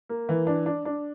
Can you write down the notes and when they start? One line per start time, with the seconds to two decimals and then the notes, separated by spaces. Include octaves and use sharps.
0.09 A#3
0.29 E3
0.47 D4
0.66 D4
0.85 D4